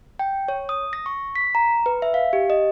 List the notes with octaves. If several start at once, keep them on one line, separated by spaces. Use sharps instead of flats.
G5
C#5
D#6
A#6
C#6
B6
A#5
B4
E5
F5
G4
D#5